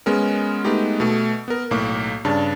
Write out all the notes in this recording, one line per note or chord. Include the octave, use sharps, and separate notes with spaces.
G#3 B3 C#4 A#4
G#3 A3 B3 D#4 G4
B2 A3
B3 A#4
B1 A2 A#3 D6
G2 C#3 D4 A5